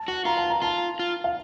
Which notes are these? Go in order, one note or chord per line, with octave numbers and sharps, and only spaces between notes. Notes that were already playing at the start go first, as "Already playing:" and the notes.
Already playing: A5
F#4 F#5
F4 A#5
A5
A#5
F4 A5
F4
F5